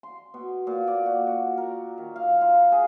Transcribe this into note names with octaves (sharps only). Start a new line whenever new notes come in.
C6
B2
A#2
D5
F#4
F#4
A#4
D#3
F5
F4
G#4